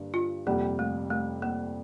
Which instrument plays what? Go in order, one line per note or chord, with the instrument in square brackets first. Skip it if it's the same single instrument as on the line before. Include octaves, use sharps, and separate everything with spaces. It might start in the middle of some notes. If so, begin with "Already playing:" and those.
Already playing: [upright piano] G2 D3 A#3 D4
[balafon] F4
[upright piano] F2 C3 G3 [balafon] A#3
[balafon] A3
A3
A#3